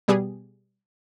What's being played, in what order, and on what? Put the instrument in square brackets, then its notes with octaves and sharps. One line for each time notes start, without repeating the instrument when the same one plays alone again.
[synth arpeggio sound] B2 G3 B3 G4 G#4